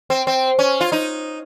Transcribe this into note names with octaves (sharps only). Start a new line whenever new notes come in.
C4
C4
C#4
F4
D#4